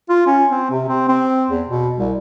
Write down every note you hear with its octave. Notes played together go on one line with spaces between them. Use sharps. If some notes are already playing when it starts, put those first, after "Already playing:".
F4
C#4
C4
C3
C4
C4
E2
B2
C2